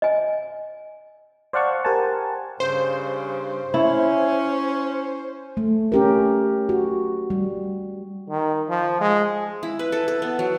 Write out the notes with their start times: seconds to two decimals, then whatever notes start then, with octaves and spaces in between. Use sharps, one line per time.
0.02 D#5 G#5
1.53 C5 D5 F5 F#5 A5 C#6
1.85 G4 A#4 C5 F#5 G#5 A5
2.60 G2 C#3 C5
3.74 C#4 E4
5.57 A3
5.92 C#4 G4 A#4
6.69 F#4
7.30 G3
8.30 D#3
8.69 F3
9.00 G#3
9.63 E4
9.79 B4
9.92 A4
10.08 A4
10.22 B3
10.39 F#3